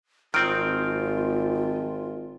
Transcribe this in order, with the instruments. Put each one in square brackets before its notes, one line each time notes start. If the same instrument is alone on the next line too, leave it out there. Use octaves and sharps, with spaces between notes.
[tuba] G#1 [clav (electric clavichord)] D#3 C4 [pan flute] F4 [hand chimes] F6 D7